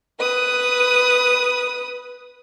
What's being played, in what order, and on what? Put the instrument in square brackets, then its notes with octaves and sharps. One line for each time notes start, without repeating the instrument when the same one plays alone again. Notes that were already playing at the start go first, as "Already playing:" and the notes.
[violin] B4 D#6